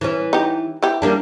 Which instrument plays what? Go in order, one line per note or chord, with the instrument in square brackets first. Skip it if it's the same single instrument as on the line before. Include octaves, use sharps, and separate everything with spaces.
[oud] E3 C#4
[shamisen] D#4 G4
E3 G4
[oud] G3 A#3 D4